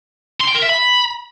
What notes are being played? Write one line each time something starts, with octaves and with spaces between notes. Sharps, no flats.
C6
G5
A#4
E5
B5